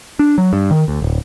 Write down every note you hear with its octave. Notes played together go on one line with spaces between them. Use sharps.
D4
F#3
G2
D#3
D2
D1